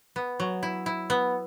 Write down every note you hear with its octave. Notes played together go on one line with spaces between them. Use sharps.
B3
F#3
E4
E4
B3